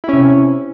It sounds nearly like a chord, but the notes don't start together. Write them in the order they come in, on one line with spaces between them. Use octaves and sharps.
E4 C#4 C3